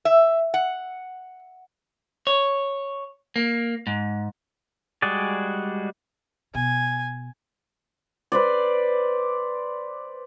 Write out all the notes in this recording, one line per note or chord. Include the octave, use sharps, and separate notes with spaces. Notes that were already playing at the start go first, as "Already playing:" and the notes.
E5
F#5
C#5
A#3
G#2
G3 G#3 F#4 G#4 D5
B2 G#5
B4 C5 D5